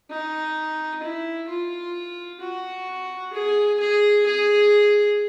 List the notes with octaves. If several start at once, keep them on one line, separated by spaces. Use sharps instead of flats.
D#4
E4
F4
F#4
G#4
G#4
G#4